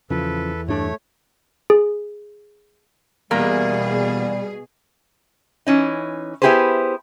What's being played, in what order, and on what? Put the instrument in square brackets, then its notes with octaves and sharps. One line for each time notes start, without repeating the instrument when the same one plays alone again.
[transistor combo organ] E2 [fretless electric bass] C#3 F3 [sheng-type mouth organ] A4 B4
[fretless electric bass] G2 D4 [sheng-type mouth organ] A3 C#5
[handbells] G#4
[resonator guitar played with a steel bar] E2 A#3 A#5 [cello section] B2 G#4 [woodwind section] G3
[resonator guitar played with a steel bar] E3 C#4 D#4
B3 E4 G4 G#4 B4 C5